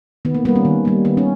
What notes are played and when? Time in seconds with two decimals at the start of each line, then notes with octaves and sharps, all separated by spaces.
0.25 D#3 B3
0.35 A#3
0.45 A#3 B3
0.49 G3
0.56 C#4
0.65 D#3
0.85 G3 A#3
1.05 D#3 B3
1.17 C#4